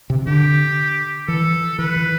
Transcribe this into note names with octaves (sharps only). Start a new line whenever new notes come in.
C3
D3 G4
E3 A4
E3 B4
E3